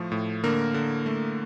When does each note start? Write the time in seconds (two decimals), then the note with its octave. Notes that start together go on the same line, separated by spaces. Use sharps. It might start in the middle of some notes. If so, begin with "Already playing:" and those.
Already playing: A2 F3 A3
0.12 A2
0.44 D3 A#3 A#4
0.74 D3
1.06 A3